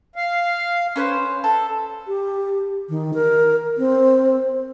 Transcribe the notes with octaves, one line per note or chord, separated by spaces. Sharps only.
F5
C#4 B4 C5
A4
G4
D#3
A#4
C4